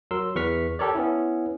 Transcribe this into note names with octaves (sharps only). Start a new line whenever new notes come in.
F#3 A#4 C6 E6
E2 B4 C#6 F6 B6
G4 A4 A#4 C#5 D5
B3 C#4 E4